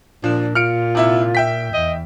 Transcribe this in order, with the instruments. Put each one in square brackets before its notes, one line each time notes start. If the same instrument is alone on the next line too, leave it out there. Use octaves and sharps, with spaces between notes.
[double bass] A#2 [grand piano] F3 [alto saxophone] D4
[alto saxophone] F4 [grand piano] F6 C#7 D7
[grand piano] C3 E4 E5
E5 G5 B6
[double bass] E2 [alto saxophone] D#5